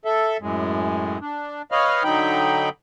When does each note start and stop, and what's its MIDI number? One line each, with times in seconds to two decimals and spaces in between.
0.05 0.37 69
0.05 0.37 76
0.41 1.18 42
0.41 1.18 45
0.41 1.18 56
1.21 1.62 62
1.72 2.03 71
1.72 2.03 73
1.72 2.03 75
1.72 2.03 77
1.72 2.03 83
1.72 2.03 89
2.04 2.69 50
2.04 2.69 54
2.04 2.69 63
2.04 2.69 79
2.04 2.69 83